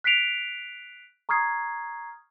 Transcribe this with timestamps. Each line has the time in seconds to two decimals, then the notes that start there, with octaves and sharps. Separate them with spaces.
0.04 F#6 B6 C7 D7 F7
1.29 A#5 C#6 D#6 F6 G#6 C7